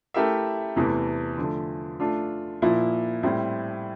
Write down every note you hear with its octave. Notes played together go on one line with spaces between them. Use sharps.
A3 E4 G4 A#4 E5
E2 C3 E3 A3
D3 F3 A3
A3 D4 F4
A#2 F3 A#3 E4
A2 G3 C4 E4